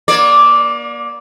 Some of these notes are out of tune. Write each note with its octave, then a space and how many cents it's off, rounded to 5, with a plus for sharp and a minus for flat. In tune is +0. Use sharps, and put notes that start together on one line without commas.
A#3 +35 D5 -5